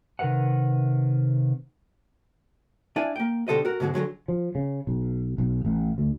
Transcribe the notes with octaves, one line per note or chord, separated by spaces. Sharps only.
C3 D#3 A#4 B4 F#5
D4 E4 D5 F5 G#5
A#3 G5
B2 D3 G3 A4 C5 D#5
F#4 A#4
G#2 B2 D3 E3 F#3 G#3
D3 E3 F#3 G#3
F3
C#3
B1
B1
A1
D2